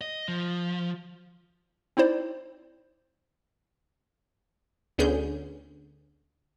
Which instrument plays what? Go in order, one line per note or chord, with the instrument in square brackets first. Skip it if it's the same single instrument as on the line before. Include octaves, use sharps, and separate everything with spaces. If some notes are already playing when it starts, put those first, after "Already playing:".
[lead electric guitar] D#5
F3
[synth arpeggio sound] C4 D#4 E4 C5 D5
[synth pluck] D2 D3 B3 C#4 G#4 G6